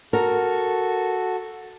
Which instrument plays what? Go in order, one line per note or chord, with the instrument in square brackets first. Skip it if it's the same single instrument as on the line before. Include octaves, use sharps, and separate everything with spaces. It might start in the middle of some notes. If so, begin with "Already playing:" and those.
[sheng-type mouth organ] F#4 A4 [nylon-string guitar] A#4